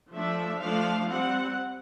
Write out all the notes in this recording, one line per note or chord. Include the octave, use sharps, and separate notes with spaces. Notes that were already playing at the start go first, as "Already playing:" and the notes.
F3 A3 D4 E5
F3 A3 D4 F5
G3 C4 F#5